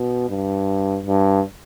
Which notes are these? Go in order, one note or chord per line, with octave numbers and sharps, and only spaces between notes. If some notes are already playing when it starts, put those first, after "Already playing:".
Already playing: B2
G2
G2